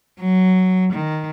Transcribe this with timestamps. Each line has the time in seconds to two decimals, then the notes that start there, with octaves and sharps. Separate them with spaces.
0.19 F#3
0.93 D#3